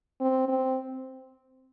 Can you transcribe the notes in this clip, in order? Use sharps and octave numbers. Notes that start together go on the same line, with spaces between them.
C4
C4